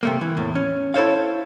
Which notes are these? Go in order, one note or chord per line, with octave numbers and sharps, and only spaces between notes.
C3 A3 A#3
E3
E2 A2
C#4
E4 A4 C5 C#5 F5